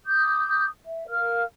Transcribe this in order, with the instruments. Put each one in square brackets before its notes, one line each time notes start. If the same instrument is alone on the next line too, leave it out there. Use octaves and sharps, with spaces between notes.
[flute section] D6 D#6 G6
E5
A#4 F5 F6